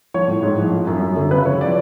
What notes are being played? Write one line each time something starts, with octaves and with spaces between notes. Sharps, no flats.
F3 C#5
A2
G#2
F3
F3
F#2
F#2
D3
C#3 B4
F3 C#5
F3 D5